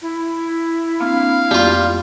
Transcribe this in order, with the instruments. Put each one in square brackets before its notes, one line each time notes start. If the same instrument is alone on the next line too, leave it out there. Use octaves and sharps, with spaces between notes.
[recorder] E4
[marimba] A#3 C4 D4 [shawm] F5
[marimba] F2 A#3 B3 [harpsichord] G3 F4